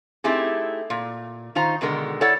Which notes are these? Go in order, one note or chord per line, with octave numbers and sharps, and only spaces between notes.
A3 C4 D#4 E4 G4 G#4
A#2
D#3 D#4 F4 C5 A#5
B2 D3 D#3 G#3 A#4
E4 A4 C#5 D5 F#5